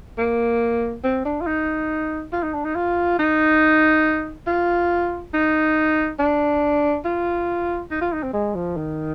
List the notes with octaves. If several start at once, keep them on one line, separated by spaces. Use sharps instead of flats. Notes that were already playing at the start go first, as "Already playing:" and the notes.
A#3
C4
D4
F4
D#4
F4
D#4
D4
D#4
F4
D#4
F4
D#4
D4
F4
D#4
F4
D#4
C4
G#3
F3
D#3